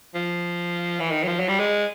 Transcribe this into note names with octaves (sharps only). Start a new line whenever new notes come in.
F3
E3
D#3
F#3
F3
F#3
G3
G#3